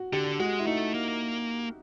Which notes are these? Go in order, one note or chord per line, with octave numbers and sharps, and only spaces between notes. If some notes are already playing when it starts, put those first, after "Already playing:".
Already playing: F#4
D3 G4
G#3 F#4
E4
A3 D#4
A#3